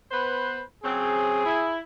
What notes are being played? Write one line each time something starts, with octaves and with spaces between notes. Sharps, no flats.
B3 B4 C5
C#3 F#3 C4 G#4
E4